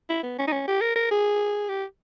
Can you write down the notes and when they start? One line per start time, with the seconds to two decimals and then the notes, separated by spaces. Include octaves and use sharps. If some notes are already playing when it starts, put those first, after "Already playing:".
0.09 E4
0.23 B3
0.39 C#4
0.47 D#4
0.52 C#4
0.68 G4
0.81 A#4
0.95 A#4
1.11 G#4
1.69 G4